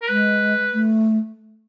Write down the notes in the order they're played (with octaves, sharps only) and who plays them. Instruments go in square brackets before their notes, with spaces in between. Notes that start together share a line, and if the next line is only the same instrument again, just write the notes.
[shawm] A#4
[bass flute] G#3 [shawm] B4
[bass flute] A3